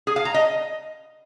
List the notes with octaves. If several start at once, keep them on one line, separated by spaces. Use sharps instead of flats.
G#4
F5
A#5
D#5